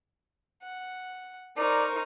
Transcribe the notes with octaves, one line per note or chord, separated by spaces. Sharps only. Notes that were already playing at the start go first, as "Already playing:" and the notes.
F#5
D#4 A#4 C5 D5 C#6